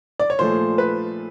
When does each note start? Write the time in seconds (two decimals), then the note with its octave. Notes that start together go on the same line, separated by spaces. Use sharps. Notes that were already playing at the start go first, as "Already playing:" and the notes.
0.20 D5
0.30 C#5
0.39 A#2 F3 A3 C5
0.78 B4